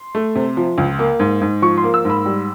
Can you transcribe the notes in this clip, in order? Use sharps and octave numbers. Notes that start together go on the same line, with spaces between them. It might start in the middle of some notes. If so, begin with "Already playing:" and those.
Already playing: C6
A3
C3
F3
C#2
A#3
G#2
G#2
F3 C#6
C6
A#3
E6
G#2 B5
G3